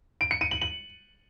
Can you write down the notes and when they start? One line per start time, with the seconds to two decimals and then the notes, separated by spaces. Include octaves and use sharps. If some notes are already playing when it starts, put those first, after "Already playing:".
0.21 D7
0.31 C#7
0.41 D#7
0.51 F#7
0.61 F#7